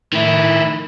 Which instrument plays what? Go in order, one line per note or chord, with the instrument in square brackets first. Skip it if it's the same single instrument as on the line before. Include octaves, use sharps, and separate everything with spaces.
[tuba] A2 [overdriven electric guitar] D#3 E4